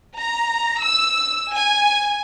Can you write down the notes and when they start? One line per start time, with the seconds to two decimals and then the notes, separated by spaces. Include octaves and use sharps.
0.19 A#5
0.83 E6
1.53 G#5